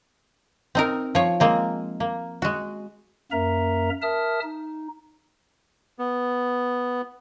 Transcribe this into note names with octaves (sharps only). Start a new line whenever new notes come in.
C4 D#4 A#4
F3 C#5
G#3 A#3 C4
A#3
G#3 F#4
F#2 A#3 A#4 E5 A#5
A#4 E5 A5 D#6 F6
D#4
B3